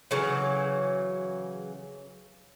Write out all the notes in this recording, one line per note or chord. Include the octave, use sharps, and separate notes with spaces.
C#3 E3 F#3